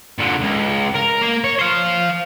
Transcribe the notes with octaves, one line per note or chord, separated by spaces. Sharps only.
A#2 D3
C#2
A#4
A#3
C#5
C5 F5